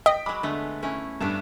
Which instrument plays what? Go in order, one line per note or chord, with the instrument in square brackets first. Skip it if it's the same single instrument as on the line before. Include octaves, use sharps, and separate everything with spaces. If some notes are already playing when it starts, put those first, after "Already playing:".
[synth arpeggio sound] D#5 [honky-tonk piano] G5 B6
[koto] F#3 G#3 [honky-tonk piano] B5 D6
[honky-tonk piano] D3 [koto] G#3 A3 B3
[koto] A3 C#4 E4
[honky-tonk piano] G2 [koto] A3 B3 D4